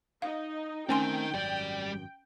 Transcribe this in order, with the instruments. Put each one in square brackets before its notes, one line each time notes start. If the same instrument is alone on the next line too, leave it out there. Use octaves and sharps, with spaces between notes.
[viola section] D#4 [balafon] F5
[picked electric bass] A3 C4 [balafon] C#4 G#5 C6 [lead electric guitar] D#4 A#4 [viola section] G5
[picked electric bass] G#1 F#2 [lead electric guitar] G3 D5